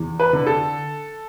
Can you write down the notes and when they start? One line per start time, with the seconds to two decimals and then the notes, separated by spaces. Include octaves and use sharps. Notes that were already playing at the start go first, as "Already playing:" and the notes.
Already playing: E2
0.20 B4
0.33 D3
0.47 A4